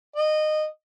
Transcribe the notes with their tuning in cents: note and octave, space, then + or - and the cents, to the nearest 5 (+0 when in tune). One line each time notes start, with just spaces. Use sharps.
D#5 -20